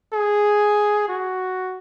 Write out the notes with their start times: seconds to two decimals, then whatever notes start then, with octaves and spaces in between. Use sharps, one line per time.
0.13 G#4
1.08 F#4